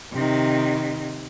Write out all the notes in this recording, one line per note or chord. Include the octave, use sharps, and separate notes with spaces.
C3 D#3